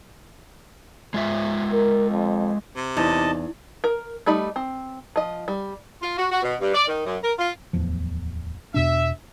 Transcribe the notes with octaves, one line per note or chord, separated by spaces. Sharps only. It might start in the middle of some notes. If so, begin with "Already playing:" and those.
G#3 F4 E5
A#4
F2
C3
E2 D#4 E4 D#5 A5
A#4
G3 A3 D#4 B5
C4
F3 D#5
G3
F4
F#4
F#4
B2
G2
D5
D#3
F#2
A#4
F4
D1 E2 F3
E2 B2 D4 E5